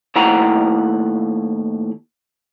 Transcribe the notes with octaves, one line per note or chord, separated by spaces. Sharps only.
D#2 A2 E4 F#5 G5 A#5